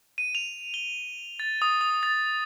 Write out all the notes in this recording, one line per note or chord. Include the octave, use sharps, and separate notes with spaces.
D#7
F7
G7
A6
D#6
D#6
A6